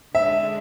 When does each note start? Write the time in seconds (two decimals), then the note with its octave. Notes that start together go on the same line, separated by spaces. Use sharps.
0.14 D3 G#3 D4 E5